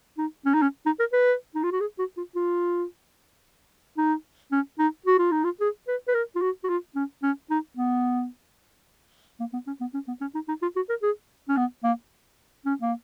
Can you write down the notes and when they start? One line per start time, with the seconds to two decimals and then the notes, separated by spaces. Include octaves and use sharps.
0.18 D#4
0.46 C#4
0.54 D#4
0.62 C#4
0.86 D#4
1.00 A#4
1.13 B4
1.55 D#4
1.64 F4
1.72 F#4
1.81 G#4
1.99 F#4
2.17 F4
2.35 F4
3.98 D#4
4.52 C#4
4.79 D#4
5.06 F#4
5.19 F4
5.32 D#4
5.45 F4
5.61 G#4
5.88 B4
6.08 B4
6.14 A#4
6.36 F4
6.42 F#4
6.64 F#4
6.69 F4
6.96 C#4
7.23 C#4
7.50 D#4
7.77 B3
9.40 A#3
9.53 B3
9.67 C#4
9.81 B3
9.94 C#4
10.08 B3
10.21 C#4
10.35 D#4
10.49 D#4
10.62 F4
10.76 F#4
10.90 A#4
11.03 G#4
11.49 C#4
11.57 B3
11.84 A#3
12.66 C#4
12.82 A#3